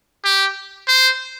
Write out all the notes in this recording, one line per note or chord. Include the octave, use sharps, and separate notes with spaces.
G4
C5